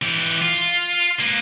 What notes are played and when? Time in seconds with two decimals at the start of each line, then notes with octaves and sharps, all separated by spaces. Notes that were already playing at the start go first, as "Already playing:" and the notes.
0.02 E3 G4
0.42 F4
1.20 A#3 B4